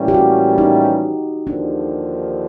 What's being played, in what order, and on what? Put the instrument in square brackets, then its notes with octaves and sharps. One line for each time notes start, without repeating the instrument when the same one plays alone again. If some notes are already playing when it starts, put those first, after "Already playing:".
Already playing: [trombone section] A2 E3 G3 A#3 C#4
[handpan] G4
F#4
D#4
[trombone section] D#2 D3 F3 [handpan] D4